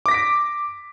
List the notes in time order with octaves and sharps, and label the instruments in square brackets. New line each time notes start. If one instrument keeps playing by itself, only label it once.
[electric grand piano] D6
A#6
B6
D7